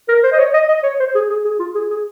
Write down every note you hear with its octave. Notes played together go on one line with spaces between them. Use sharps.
A#4
C5
D#5
C#5
D#5
D#5
C#5
C5
G#4
G#4
G#4
F4
G#4
G#4